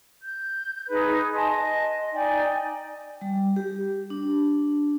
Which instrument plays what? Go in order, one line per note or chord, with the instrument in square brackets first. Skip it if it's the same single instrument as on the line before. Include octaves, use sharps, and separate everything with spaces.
[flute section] G6
D#4 G#4 B4
D#5 G#5 A5 C6
D#5
D#4 D5 G5 G#5
[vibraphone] G3
G4
D4